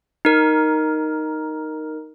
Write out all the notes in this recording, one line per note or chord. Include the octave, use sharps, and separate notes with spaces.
D#4 A#4